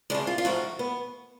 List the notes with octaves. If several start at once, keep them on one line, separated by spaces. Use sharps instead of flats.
D2 C#3 G#3 D4
F4
F4
G#2 F3 A3 F#4
B3